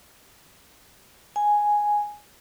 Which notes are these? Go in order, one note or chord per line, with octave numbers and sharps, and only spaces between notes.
G#5